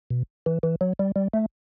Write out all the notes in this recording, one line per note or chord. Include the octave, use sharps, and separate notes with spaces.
B2
E3
E3
F#3
G3
G3
A3